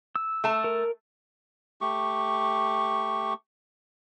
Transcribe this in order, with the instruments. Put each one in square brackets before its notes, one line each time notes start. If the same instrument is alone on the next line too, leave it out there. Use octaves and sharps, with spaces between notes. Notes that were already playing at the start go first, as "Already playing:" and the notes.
[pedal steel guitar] E6
[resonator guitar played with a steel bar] A3 A5
[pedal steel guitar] A#4
[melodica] A3 G4 C#6